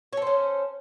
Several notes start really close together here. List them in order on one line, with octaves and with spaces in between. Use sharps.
C#5 A4 C5 C#4